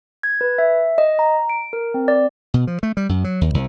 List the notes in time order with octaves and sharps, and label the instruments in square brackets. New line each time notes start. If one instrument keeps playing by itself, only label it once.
[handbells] G#6
B4
E5
D#5
A#5
D7
A#4
C4
D5
[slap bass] B2
F3
A3
G3
F#2
F#3
D#2
C2